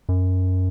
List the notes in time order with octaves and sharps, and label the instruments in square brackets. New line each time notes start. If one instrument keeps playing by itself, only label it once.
[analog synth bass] F#2